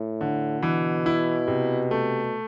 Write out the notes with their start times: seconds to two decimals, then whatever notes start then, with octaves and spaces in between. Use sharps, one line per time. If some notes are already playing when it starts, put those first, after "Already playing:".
Already playing: A2
0.21 D3
0.63 B2 E3
1.06 E4
1.48 C3
1.91 A3